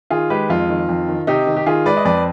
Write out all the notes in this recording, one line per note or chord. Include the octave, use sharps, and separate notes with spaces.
D#3 F4 G#4
G#3 G4 B4
F2 F4
D#3
F2
D#3
C3 D#4 G4
D#3
G4
D#3 F4 G#4
G#3 B4 D5
D#5
F2 B4 D5